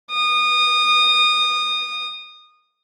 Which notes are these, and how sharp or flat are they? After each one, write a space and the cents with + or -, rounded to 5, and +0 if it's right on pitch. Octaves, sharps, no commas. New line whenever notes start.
D#6 -25